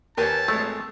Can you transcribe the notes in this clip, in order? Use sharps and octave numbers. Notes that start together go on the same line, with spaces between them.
D#2 G4 A#4 B4 C#5 G#5 A5
G#1 G#3 A3